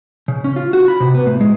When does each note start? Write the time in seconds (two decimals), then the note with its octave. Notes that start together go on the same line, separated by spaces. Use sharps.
0.28 C#3
0.44 C#4
0.56 F4
0.73 F#4
0.88 B5
1.00 C3
1.15 B3
1.26 A2
1.41 G#3